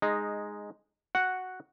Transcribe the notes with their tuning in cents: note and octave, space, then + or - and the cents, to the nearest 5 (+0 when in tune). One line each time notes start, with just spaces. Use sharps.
G#3 +0 D#4 -5
F#4 +0 F#5 +0